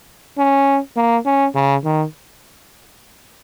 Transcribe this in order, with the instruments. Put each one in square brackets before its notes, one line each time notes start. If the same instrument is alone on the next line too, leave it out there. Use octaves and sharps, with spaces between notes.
[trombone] C#4
A#3
C#4
C#3
D#3